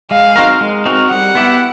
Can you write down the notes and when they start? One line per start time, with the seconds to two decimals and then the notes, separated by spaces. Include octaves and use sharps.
0.11 G#3 F5
0.36 C4 D#4 F#4 A#4
0.61 G#3
0.86 C4 D#4 F#4 A#4
1.11 G3 F#5
1.35 B3 E4 G4